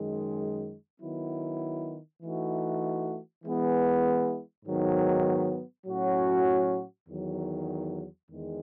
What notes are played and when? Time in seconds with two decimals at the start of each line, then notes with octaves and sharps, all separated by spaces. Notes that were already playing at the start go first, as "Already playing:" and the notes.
Already playing: F#2 D#3 G#3
1.01 D#3 F#3 B3 E4
2.22 E3 A3 D#4 F#4
3.43 E3 G#3 B3 E4
4.65 G#2 D#3 F#3 B3
5.86 A2 F#3 C#4 F#4
7.08 E2 D#3 F#3
8.29 E2 D#3 G#3